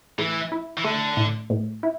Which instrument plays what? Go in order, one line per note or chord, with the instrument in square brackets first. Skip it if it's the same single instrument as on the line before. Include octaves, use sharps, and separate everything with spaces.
[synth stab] A2 [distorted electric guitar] E3
[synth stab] E4
[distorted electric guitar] E3
[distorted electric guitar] D3 [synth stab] A3
[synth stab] A2
A2
E4